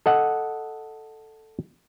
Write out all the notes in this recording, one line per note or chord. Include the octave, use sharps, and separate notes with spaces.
A4 D#5 F#5